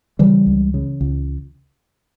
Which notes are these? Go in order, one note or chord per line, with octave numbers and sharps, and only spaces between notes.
C#3 E3 G3
C#2
C#3
C#2